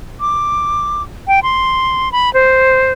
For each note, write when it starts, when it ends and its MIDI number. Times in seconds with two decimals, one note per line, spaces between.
0.20 1.02 86
1.27 1.40 79
1.43 2.12 84
2.12 2.32 83
2.33 2.92 72